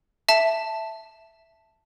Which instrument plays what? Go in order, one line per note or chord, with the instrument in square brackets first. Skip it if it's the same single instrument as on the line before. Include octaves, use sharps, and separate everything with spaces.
[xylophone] E5 A5